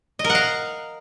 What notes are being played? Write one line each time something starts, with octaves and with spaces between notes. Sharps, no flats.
D#5
A#4
F#5
F5